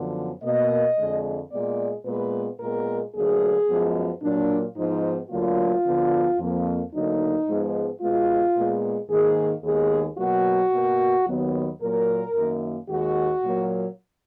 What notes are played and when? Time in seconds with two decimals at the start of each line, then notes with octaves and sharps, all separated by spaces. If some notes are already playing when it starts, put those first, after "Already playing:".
Already playing: F#2 D3 F3 B3
0.43 B2 A#3 D#5
0.97 F2 D3 G#3
1.51 A#2 G#3 B3 D5
2.06 A#2 G#3 B3 B4
2.60 A#2 G#3 B3 A#4
3.14 D2 D3 F#3 A#3 G#4
3.68 F#2 F3 G#3 B3
4.22 A#2 F#3 A#3 D4
4.77 G#2 F3 B3 D#4
5.30 D2 D3 F#3 A#3 F4
5.85 D2 D3 F3 B3
6.39 F2 F3 A#3
6.93 D2 D3 F#3 A#3 D#4
7.47 G#2 F3 G#3 B3
8.01 B2 G#3 B3 F4
8.56 A#2 G#3 B3
9.10 G#2 D#3 A#3 G#4
9.64 D#2 D#3 G#3 B3 G#4
10.18 B2 F#3 A#3 F#4
10.72 B2 A#3
11.27 D#2 D#3 F#3 B3
11.81 A#2 F#3 A#3 A#4
12.35 F#2 D#3 A#3
12.89 D#2 D#3 G#3 F#4
13.43 A#2 F#3 A#3